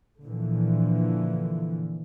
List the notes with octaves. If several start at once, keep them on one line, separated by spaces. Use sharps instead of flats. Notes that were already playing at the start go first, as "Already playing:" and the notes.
A#2 D3 E3 F3